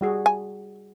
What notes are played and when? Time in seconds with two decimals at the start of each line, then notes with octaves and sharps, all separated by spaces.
0.01 G3 F#4 G#4
0.26 G#5